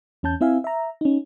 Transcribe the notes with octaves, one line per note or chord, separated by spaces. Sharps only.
E2 C#4 A5 G6
C4 E4 E5 F5 G#5
E5 A#5
C#4 D#4